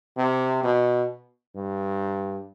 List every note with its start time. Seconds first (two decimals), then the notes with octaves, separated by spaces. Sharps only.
0.17 C3
0.64 B2
1.56 G2